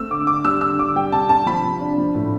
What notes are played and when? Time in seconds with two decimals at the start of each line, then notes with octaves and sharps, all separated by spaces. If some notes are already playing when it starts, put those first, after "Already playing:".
Already playing: A3 C4 E6
0.11 D3 D6
0.27 D3 D6
0.45 G3 E6
0.61 D3 E6
0.78 D3 D6
0.96 G3 G5
1.12 C3 A5
1.29 C3 A5
1.46 F3 B5
1.64 C3
1.80 D4
1.98 F3
2.15 A2